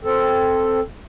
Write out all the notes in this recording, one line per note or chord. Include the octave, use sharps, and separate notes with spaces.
C4 A4